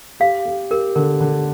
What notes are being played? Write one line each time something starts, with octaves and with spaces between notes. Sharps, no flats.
G4 F5
G4
G4 A#4
D3 A#4
D3